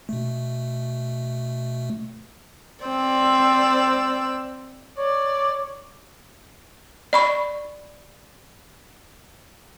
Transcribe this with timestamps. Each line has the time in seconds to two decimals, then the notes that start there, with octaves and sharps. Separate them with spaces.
0.09 B2 A3
2.85 C4 D5 E6
4.98 C#5 D5
7.13 D5 B5 C#6